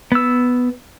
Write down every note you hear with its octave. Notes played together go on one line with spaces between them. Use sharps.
B3 E6